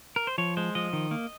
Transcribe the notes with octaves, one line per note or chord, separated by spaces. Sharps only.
A#4
C5
F3 C#5
G#3 C5
F3 D#5
D#3
A#3